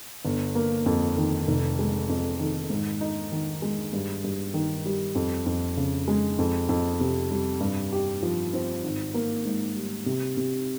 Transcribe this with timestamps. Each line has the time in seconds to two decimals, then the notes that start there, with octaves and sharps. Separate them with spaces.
0.25 G1
0.55 A#3
0.86 F2
1.17 D#3
1.47 F1
1.79 G#3
2.09 F2
2.39 D#3
2.70 G#2
3.01 D#4
3.32 D#3
3.62 G#3
3.93 G2
4.24 G2
4.54 D#3
4.86 G3
5.15 F2
5.46 F2
5.77 C#3
6.08 G#3
6.38 F2
6.69 F2
7.00 C3
7.31 G3
7.61 G2
7.92 G4
8.23 F3
8.53 C4
8.84 G#1
9.14 A#3
9.45 G#2
9.76 G3
10.06 C3
10.37 C3